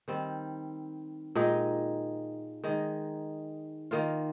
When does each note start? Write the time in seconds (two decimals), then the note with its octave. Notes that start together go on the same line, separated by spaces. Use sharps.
0.08 D#3 G3 C4
1.35 A#2 G#3 D#4 G4
2.64 D#3 G#3 D#4
3.91 D#3 A#3 F4